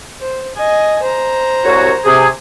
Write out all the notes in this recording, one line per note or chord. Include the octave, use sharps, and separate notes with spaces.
C5
D#5 G#5
C5 A#5
C2 F#4 C#5
C3 G#4